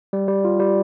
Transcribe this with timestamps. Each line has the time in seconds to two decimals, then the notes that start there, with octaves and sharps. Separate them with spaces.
0.13 G3
0.28 G3
0.44 F4
0.60 G3